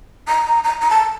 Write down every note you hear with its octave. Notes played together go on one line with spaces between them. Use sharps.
A#5
A#5
A#5
A5